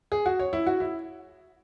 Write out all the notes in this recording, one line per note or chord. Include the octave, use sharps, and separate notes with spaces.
G#4
F#4
C#5
E4
F#4
E4